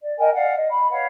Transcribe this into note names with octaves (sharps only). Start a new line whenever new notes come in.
D5
A#4 D#5 G5 G#5
D5 F5 F#5
D#5
B5
B4 C#5 F5 F#5